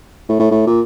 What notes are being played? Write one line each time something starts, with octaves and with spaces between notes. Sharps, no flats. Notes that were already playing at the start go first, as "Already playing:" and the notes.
A2
A2
A2
A#2